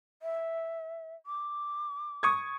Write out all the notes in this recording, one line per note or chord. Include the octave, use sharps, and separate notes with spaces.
E5
D6
C#6 D#6 G#6